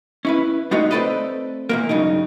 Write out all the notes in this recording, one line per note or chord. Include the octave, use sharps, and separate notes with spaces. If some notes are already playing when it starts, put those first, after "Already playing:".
C#4 E4 B4
G3 A3 B3 D#4 F4 F#4
A3 C4 A4 B4 D5 D#5
E2 A#2 A#3
G2 C#3 F#3 D#4